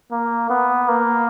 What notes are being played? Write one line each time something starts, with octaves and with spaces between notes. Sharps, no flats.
A#3
B3
A#3